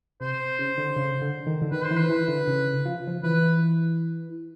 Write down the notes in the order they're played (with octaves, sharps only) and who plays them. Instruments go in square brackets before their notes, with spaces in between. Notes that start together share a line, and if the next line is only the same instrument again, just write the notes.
[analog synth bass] C3 [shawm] C5
[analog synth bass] C#3
D3
C#3
D3
D#3
D3
[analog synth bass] D#3 [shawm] B4
[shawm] C5
[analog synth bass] E3
[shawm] B4
[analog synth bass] E3
D3
C#3
F3
F3
[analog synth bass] E3 [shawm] B4